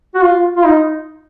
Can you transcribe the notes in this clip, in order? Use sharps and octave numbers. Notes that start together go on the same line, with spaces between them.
F#4
F4
F4
D#4